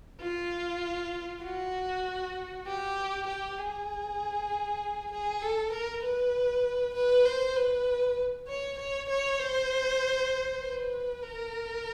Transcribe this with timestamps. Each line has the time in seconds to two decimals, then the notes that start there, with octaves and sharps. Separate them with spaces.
0.21 F4
1.44 F#4
2.67 G4
3.28 G4
3.59 G#4
5.12 G#4
5.42 A4
5.73 A#4
6.03 B4
6.95 B4
7.25 C5
7.56 B4
8.48 C#5
8.79 C#5
9.09 C#5
9.40 C5
10.61 B4
11.23 A#4